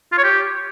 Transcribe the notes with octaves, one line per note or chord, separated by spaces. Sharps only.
F4
C#5
G4